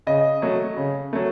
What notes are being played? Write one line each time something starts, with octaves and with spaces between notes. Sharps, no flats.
C#3 D#5
F#3 A3
C#3
F#3 A3